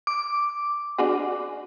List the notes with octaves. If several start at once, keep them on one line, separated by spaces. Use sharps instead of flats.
D6
D4 F#4 G#4